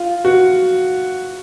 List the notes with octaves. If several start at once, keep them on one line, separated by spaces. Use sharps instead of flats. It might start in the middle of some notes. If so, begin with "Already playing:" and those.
Already playing: F4
F#4